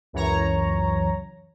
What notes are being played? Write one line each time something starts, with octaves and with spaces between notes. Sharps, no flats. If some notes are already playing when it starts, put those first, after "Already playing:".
C#2 F#2 E3 C#5 A#5